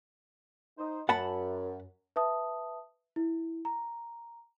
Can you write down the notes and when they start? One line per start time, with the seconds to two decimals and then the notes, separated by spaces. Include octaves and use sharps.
0.78 D#4 C5
1.09 F#2 F#5 A5 B5
2.16 B4 E5 A5 D#6
3.16 E4
3.65 A#5